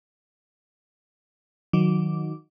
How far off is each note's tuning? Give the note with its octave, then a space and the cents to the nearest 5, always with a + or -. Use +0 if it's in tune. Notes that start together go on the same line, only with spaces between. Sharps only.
D#3 +0 F#3 -15 D6 -10